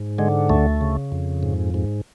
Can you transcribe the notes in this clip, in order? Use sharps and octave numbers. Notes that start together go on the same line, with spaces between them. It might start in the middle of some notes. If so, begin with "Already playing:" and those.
Already playing: G#2
D3 G#3
D2 A3
C#3
F2
G#2
G#2